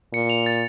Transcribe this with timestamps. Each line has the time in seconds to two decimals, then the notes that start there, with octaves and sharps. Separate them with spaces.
0.13 A#2 C#7
0.30 F7
0.46 A6